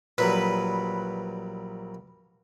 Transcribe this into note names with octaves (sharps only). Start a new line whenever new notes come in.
A#1 F#3 G3 B4